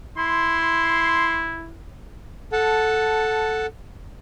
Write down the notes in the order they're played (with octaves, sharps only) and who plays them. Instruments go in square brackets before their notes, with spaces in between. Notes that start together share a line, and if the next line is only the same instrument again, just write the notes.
[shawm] E4 [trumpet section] C6
[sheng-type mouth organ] A4 F#5 A5